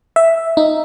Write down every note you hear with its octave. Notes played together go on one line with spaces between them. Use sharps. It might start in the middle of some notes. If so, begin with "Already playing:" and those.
E5
D#4